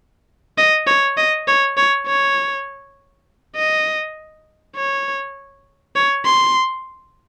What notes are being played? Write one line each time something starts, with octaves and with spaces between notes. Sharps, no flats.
D#5
C#5
D#5
C#5
C#5
C#5
D#5
C#5
C#5
C6